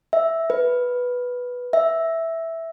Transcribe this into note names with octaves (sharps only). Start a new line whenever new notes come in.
E5
B4
E5